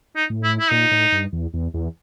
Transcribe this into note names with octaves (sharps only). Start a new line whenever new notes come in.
D#4
A2
E4
E4
A#2 D#4
A2
G2
E2
E2
E2